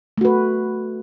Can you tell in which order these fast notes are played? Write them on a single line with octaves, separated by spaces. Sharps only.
A3 F#4 B4